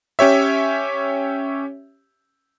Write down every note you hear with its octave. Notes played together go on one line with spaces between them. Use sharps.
C#4 G4 C#5 E5